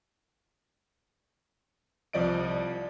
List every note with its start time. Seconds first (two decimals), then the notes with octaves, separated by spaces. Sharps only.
2.13 C2 F3 D5 D#5 D7